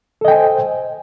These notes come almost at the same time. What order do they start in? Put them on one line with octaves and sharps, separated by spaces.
A4 D#5 G5 G#5 C5